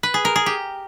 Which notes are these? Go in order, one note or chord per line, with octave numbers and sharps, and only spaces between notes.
B4
G#4
A#4
G#4
G4